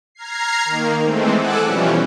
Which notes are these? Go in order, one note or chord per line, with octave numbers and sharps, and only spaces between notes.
A#5 F6 G#6 C7
D#3 A#3
E3 G#3 A3 C4
A4 F#5 G#5 D6 E6 F#6
B2 E3 F3 G3 C#4